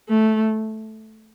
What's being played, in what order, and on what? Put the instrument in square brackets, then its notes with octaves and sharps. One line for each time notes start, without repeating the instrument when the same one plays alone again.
[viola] A3